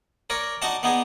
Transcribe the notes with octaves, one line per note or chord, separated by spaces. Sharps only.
A#4 C#5 D5
D4 D#4 F#4 F#5 A5
B3 D4 D#4 G#4